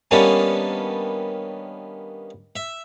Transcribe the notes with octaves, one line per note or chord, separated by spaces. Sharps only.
D#3 G3 A#3 B3 C#4 D4
E5